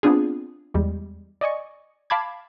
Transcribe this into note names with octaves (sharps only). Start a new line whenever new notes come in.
B3 C4 D4 F4 G#4
E2 G3 G#3
D5 D#5 G#5 C#6
F5 A5 B5 D6 G#6